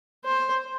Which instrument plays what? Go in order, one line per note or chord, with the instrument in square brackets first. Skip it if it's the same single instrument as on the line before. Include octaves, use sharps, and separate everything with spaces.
[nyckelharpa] C5